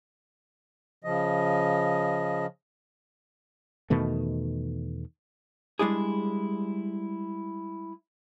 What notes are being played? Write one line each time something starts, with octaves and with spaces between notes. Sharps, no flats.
C#3 F3 D#5
E2 B2 D#3 A3
G3 G#3 D4 E4 G#4